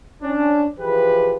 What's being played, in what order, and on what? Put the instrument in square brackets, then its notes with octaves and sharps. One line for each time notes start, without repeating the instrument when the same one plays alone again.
[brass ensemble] C#4 D4
E3 F3 G4 G#4 B4